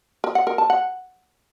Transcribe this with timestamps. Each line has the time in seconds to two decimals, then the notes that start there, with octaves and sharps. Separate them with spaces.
0.24 A#4
0.35 F#5
0.47 A#4
0.58 A5
0.70 F#5